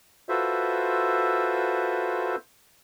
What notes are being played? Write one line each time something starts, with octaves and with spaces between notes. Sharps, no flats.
F4 F#4 A4 B4 C5 E5